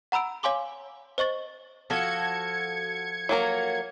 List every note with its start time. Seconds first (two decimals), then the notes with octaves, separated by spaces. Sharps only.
0.12 F#5 A#5 B5 E6 D7
0.43 C#5 F5 G#5 C6 D6 G7
1.18 C5 D#5 C#6 A6
1.90 F3 F#4 A4 G#6 C#7
3.29 F#3 A#3 A#4